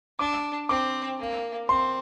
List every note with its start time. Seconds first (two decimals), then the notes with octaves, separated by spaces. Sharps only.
0.19 D4 D6
0.69 C4 D6
1.19 A#3
1.68 C4 C6